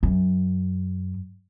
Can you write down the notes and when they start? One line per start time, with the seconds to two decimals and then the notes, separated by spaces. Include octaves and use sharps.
0.03 F#2